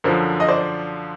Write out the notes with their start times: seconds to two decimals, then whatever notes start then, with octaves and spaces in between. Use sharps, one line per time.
0.04 F#2 D3 F3 A#4 C5
0.40 D#5
0.48 C5 D5